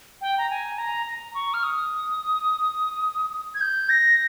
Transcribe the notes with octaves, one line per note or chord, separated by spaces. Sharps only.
G5
A#5
G#5
A#5
A#5
C#6
F6
D#6
G#6
G6
A#6